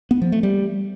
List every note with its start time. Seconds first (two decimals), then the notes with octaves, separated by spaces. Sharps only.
0.11 B3
0.22 F3
0.32 A3
0.43 G3